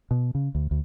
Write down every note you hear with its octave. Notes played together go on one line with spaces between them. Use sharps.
B2
C#3
D2
D2